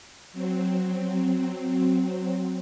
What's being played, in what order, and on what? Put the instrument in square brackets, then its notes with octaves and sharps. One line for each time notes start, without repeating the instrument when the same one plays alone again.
[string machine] F#3 C4